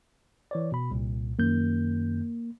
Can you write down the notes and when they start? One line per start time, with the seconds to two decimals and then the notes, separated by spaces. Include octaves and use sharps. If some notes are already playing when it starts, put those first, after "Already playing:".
0.51 E3 C#5 D5
0.72 B2 B5
0.91 C2 A#2
1.39 F#2 D#3 A#3 G6